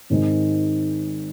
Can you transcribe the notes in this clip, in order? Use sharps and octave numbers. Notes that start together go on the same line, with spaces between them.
G#1 G#2 D#3 G#3 C4